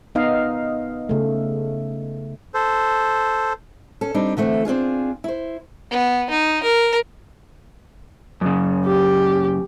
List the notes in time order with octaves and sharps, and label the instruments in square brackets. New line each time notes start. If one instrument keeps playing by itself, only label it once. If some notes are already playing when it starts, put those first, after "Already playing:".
[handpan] B3 D#4 D#5 F5
C#3 A3
[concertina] A4 C5
[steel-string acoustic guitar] C#4 A4
G3 C4 D4 D#4
D3 E3 A3 C4
C4 D4 F4 G#4
E4 C5
[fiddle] B3
D#4
A#4
[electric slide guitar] F#2 C#3
[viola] G4